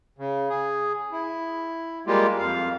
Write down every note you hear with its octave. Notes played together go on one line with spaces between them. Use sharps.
C#3
G#4
E4
G3 G#3 A#3 F4 G4
F2 F5